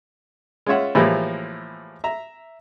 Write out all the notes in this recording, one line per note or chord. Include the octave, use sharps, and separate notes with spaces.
G#3 C#4 F4 C#5 E5 F#5
A2 E3 F3 G3 G#3 A#3
E5 A#5